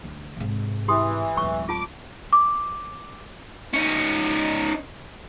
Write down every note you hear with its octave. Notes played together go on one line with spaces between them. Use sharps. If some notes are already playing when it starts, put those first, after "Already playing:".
D2
G#2 C3
E3 G4 C6 D#6
D1 G#3 C#5 C#6
F4 A5 D6
D6
C#4 D#4